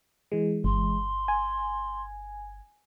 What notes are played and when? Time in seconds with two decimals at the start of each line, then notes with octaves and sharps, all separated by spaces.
0.32 E3 G#3
0.64 G1 C6
1.28 G#5